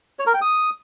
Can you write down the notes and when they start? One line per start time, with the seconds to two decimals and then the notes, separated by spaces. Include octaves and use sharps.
0.19 C#5
0.27 A#4
0.34 G5
0.42 D#6